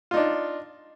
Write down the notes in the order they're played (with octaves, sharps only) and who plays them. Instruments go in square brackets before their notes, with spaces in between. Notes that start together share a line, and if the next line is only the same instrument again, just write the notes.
[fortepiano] F4
D#4
D4